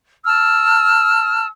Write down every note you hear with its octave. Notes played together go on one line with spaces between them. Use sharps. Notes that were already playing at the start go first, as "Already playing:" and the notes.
A5 E6 F6